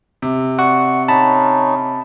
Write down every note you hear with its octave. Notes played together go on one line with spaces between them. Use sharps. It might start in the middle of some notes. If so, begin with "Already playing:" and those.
C3
D5 F#5 C#6
C#4 D#4 A5 B5